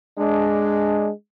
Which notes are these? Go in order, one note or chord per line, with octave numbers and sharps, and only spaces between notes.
G#3 D4